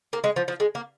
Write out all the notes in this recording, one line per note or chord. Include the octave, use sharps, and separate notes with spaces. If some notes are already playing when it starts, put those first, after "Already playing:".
A#3
G#3
F3
F3
G#3
A#3